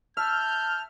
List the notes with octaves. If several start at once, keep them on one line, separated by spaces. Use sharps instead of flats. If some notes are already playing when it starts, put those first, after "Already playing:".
E5 A5 F6 G6